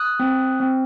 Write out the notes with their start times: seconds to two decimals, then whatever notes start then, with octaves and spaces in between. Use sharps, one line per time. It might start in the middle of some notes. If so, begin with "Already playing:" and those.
Already playing: D#6 F#6
0.20 C4
0.60 C4